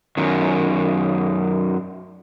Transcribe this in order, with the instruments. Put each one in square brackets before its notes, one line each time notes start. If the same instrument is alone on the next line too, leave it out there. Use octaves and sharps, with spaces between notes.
[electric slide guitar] F#2 D#3